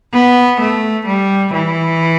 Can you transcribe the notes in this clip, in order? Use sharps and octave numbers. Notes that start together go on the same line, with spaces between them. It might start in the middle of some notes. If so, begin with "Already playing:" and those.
B3
A3
G3
E3